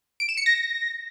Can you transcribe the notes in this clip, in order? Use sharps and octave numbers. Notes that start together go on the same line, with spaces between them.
D7
E7
C#7
A#6